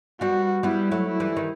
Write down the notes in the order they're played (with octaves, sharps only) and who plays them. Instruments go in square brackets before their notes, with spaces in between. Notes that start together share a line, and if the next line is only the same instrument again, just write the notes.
[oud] G3 B3 [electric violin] F#4
[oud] G3 B3 [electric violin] E4
[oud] F#3 A3
[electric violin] E4
[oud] E3 G3
D#3